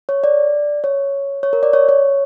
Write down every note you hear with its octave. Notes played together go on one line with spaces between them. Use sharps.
C#5
D5
C#5
C#5
A#4
D5
C#5
C#5